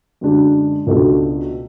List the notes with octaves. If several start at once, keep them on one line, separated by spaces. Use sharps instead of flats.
F#2 D3 G#3 D4
C#2 B2 A3 D4 A4